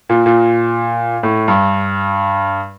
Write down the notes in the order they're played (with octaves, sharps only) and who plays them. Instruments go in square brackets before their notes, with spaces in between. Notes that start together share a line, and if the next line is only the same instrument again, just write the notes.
[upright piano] A#2
A#2
A2
G2